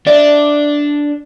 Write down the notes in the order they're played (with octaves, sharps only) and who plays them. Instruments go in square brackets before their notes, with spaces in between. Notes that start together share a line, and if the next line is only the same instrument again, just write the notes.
[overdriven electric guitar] D4 [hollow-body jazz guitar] D5 E5